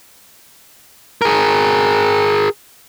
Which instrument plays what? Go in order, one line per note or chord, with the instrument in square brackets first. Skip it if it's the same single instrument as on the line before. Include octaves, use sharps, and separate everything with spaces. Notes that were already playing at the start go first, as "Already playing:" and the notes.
[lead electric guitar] G#4 A#4